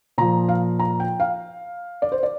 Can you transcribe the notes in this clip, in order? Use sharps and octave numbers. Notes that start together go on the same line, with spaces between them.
A#2 F3 A#5
F5
A#5
G5
F5
D5
C5
D5